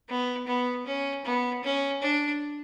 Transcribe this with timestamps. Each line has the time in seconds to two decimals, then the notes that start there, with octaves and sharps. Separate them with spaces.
0.09 B3
0.47 B3
0.86 C#4
1.25 B3
1.63 C#4
2.02 D4